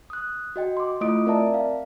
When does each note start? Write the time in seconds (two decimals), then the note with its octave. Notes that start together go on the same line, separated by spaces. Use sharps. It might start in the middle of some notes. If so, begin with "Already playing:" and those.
0.10 D#6 F#6
0.56 F#4 D#5 G5
0.77 C6 D6
1.01 A3 E4 F4 D#5 D#6 D7
1.26 C4 A#4 D5 E5 A5 A#5
1.54 F5